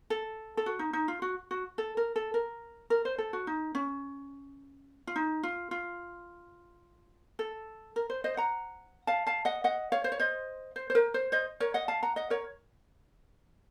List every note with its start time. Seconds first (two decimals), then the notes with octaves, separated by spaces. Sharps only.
0.10 A4
0.57 A4
0.66 F#4
0.79 D#4
0.93 D#4
1.08 F4
1.22 F#4
1.51 F#4
1.78 A4
1.97 A#4
2.16 A4
2.34 A#4
2.90 A#4
3.05 C5
3.18 A4
3.33 F#4
3.47 D#4
3.75 C#4
5.07 F4
5.16 D#4
5.43 F4
5.71 F4
7.39 A4
7.96 A#4
8.10 C5
8.24 C5 D#5
8.37 F#5 A#5
9.07 F5 A5
9.27 F5 A5
9.45 D#5 F#5
9.64 D#5 F#5
9.92 C#5 F5
10.04 C5
10.12 C#5
10.19 C5 D#5
10.76 C5
10.90 C5
10.95 A#4
11.14 C5
11.32 C5 D#5
11.60 A#4 C#5
11.74 D#5 F#5
11.88 F5 A5
12.03 F#5 A#5
12.16 D#5 F#5
12.30 A#4 C#5